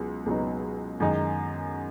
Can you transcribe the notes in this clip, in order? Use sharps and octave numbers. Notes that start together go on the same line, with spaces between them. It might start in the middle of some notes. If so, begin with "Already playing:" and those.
Already playing: C#2 B2 F#3 B3
C#2 B2 F#3 B3 D#4
F#2 D#3 G#3 D#4